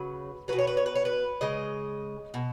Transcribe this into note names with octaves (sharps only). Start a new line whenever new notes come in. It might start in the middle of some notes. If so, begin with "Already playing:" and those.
Already playing: C#3 F#3 B4
B2 F#3 B4
C#5
B4
C#5
B4
C#5
B4
C#3 G#3 D#5
B2